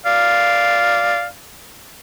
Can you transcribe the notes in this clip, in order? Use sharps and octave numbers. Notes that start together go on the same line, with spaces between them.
D5 F5